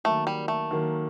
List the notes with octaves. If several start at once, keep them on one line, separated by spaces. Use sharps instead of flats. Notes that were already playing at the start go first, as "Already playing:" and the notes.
D#3 F#3 A3 A#3
G3
A3
D#3 F#3 A#3